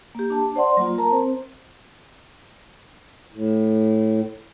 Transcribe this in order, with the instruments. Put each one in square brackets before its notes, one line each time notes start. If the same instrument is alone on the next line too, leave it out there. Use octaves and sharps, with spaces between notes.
[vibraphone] A#3 G4
D4 A5
C5 D5 F#5 C6
F#3 A#3 F4
A#4 A5 A#5
C4 C5
[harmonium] A2